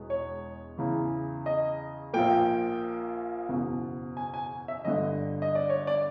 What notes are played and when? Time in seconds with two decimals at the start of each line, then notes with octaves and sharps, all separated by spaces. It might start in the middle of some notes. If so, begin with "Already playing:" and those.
Already playing: E1 E2 B2 G#3 B3
0.10 C#5
0.78 E2 C#3 E3
1.46 D#5
2.13 A#1 A#2 F3 A#3 G5
3.49 F#1 E2 B2
4.17 G#5
4.34 G#5
4.68 E5
4.85 G1 G2 D3 D#5
5.42 D#5
5.55 D5
5.69 C#5
5.87 D5